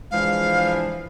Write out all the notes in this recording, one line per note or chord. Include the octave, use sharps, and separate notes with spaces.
E3 F3 G#3 D4 F5